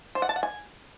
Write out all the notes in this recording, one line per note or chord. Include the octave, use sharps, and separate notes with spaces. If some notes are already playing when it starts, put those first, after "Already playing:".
C5
F#5
A5
F#5
G#5